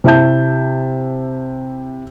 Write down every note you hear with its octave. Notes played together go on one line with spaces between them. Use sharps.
C3 E4 E5 A5 G6